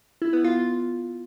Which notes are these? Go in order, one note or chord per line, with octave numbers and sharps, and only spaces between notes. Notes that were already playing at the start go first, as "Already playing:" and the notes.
E4
B3
F4